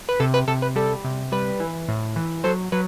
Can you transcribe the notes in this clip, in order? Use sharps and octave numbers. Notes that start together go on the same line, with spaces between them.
B4
C3 A4
B4
C3 A4
B4
G3 A4
C3
G3 B4
E3
A2
E3
F#3 A4 C5
F#3 B4